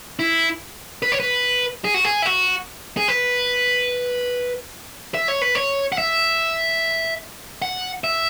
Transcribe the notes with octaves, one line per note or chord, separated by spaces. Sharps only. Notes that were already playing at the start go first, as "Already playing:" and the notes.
E4
B4
C#5
B4
G#4
F#4
G#4
E4
F#4
G#4
B4
E5
C#5
B4
C#5
F#5
E5
F#5
E5